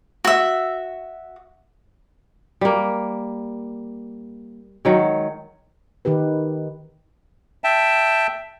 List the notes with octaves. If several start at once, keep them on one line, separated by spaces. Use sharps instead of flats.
F#4 E5
G3 A#3
D#3 F#3 G#3
D#3 D#4 G4 B4
E5 G5 A5